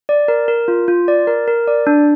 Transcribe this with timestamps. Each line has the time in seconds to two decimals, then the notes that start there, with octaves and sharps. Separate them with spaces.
0.09 D5
0.28 A#4
0.48 A#4
0.68 F4
0.88 F4
1.08 D5
1.27 A#4
1.48 A#4
1.68 D5
1.87 D4